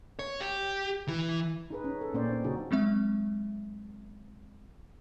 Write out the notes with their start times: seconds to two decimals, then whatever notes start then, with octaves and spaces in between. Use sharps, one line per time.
0.19 C#5
0.41 G4
1.08 E3
1.70 D#4 G#4 B4
1.84 C#4
2.01 A4
2.14 A#2 A#3 C4 C#4 C5 D5
2.30 C#4 D4
2.44 C#3 F#3 C#4 D#4 F#4 G#4
2.71 F#3 G#3 C4 E5